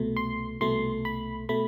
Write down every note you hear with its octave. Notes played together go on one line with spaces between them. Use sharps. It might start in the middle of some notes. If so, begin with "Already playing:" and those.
Already playing: C2 B2 A3
C6
C2 B2 A3 C6
B5
B2 A3 B5